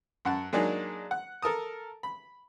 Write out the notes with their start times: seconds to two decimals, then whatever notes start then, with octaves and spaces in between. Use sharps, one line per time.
0.25 F#2 F#5 A5
0.53 F#3 G#3 A#3 D4 D#4 G#4
1.11 F#5
1.42 A4 A#4 A5 D#6
2.03 B5